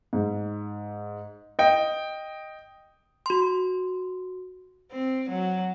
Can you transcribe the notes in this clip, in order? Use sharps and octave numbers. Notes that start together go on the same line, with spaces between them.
G#2
D#5 G5
F#4 C6
C4
F#3